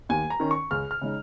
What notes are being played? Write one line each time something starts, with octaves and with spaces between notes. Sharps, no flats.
D#2 G#5
A#5
D#3 C#4
C#6
C#2 F6
F6
C#3 G#3 D#4